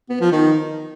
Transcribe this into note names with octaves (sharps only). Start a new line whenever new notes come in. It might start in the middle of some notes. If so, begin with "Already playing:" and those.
B3
F3
D#3